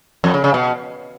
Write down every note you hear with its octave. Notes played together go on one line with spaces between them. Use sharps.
F2
C#3
C#3
B2